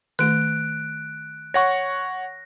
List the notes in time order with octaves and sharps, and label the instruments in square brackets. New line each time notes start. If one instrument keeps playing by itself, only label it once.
[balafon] D#3 A3 [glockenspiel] F#6 D7
[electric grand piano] C#5 F#5 C#6 [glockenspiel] A#6